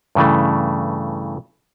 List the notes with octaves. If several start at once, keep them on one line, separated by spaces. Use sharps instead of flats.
G2 C#3 E3 A3